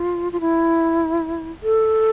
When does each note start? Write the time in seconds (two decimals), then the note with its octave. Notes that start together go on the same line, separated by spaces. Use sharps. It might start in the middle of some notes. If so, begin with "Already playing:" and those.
Already playing: F4
0.32 F4
0.41 E4
1.63 A4